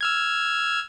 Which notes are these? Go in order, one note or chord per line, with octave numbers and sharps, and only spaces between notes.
E6 F6 G#6